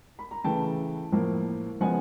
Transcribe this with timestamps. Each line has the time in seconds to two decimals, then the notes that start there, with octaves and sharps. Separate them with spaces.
0.19 B5
0.31 A#5
0.44 C#3 E3 A3 G5 A5
1.12 A2 F3 A#3
1.80 C#3 F3 G#3 B3 F#5 G#5